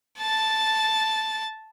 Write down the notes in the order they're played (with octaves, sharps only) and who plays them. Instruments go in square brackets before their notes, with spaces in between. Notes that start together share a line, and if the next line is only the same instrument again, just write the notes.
[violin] A5 A6